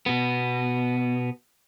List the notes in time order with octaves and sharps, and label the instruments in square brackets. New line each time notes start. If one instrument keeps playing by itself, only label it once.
[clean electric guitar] B2 B3